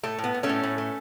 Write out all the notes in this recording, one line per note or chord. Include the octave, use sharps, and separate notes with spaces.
A2 A3
A2
B3
A2
A3 C#4
A2
A2
A3